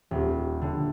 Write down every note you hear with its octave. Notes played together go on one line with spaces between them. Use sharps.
D#1
D3